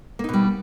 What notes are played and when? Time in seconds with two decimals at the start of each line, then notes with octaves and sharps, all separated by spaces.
0.19 A#3
0.24 D#4
0.29 B2
0.33 G3